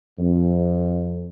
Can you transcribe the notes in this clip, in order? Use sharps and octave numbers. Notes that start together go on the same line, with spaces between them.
F2